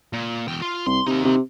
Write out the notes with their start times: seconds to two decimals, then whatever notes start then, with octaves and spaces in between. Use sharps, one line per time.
0.13 A#2
0.48 E2 G5
0.62 F4
0.86 C2 C6
1.06 C3 A#3 D#4
1.25 C3